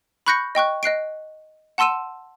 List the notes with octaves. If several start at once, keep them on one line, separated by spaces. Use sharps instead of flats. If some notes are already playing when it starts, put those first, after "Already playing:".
B5 C#6 F#6 G6 A#6 C#7
D#5 G5 C#6 F#6
D#5 F#6 C7 D7
F#5 A5 C6 E6 D#7 E7